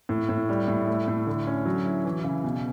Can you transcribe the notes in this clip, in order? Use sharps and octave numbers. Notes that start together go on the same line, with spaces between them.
A2
A2
G3
A2
A3
A2
D3
C#4
F#3
E4
E3
C#3
B2